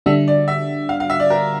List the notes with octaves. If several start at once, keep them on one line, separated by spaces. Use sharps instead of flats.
D3 G3 D4 E5
D5
E5
F5
F5
E5
D5
A#4